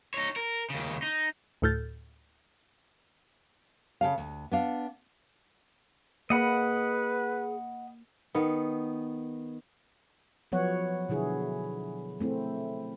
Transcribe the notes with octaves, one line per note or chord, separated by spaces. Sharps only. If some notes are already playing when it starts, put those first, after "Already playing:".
D#4 C#5
A#4
D#2 C#3
D#4
D2 A2 A4 F6 G6 A6
C#3 A4 F5
D2
B3 D4 F5
A#3 G#4 B4 D#5 F#5 B5
D#3 B3
F3 F#3 B3 C#5 F#5
B2 D3 E4 G#4
A3 C4 E4